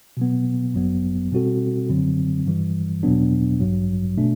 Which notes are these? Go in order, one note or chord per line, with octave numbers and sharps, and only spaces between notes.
B2 F#3 B3
G1 F#2 F#3 B3
B2 G3 C4 F#4 A4
F#2 D3 F#3 C4
G2 E3 G3
E2 B2 F#3 B3 D4
A1 G2 F#3
B2 A3 D4